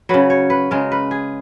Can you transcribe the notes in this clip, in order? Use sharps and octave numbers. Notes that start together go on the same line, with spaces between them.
C#3 F#3 B4
C#5
B4
C#3 G#3 A#4
B4
G#4